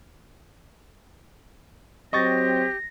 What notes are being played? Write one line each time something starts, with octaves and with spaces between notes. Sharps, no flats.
F#3 C4 G4 D#5 C#6 A6 A#6